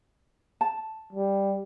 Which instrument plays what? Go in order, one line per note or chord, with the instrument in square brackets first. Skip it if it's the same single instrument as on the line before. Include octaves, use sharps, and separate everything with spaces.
[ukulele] A5
[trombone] G3